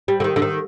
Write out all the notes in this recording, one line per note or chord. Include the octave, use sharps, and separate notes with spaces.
G3
D3
D#3
D3
D#3